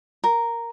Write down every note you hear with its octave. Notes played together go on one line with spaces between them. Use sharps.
A#4